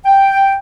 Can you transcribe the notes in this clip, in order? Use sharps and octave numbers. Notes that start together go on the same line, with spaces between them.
G5